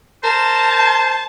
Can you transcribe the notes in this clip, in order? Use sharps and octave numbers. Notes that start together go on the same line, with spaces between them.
A#4 C5 A5